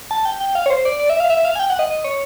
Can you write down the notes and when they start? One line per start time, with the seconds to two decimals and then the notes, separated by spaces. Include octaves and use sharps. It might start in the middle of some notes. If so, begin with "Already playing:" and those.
0.11 A5
0.25 G5
0.40 G5
0.55 F5
0.66 C#5
0.70 C5
0.85 D5
1.00 D5
1.10 E5
1.20 F5
1.30 E5
1.45 F5
1.56 G#5
1.60 G5
1.70 F#5
1.79 D#5
1.90 D#5
2.04 C#5